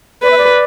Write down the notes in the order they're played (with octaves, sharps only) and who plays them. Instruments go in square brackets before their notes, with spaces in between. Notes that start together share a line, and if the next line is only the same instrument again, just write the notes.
[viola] B4 [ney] D5
[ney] E5
D5